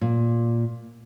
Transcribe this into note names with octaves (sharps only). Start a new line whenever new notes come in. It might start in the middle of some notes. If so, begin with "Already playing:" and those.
A#2